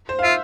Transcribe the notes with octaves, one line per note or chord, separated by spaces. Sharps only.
C5
F5
F4 E5